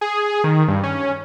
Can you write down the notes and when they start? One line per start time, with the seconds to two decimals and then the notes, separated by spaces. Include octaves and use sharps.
0.01 G#4
0.44 D#3
0.68 G2
0.83 C#4